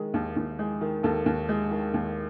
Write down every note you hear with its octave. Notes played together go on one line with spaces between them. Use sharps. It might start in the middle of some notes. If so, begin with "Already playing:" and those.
Already playing: D#3 G#3 G#4
D#2
D#2
G#3
D#3
D#2 A4
D#2
G#3
D#3
D#2